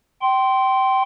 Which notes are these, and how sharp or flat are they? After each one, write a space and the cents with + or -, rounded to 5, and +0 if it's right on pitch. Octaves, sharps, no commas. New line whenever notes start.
G5 -25 C6 +0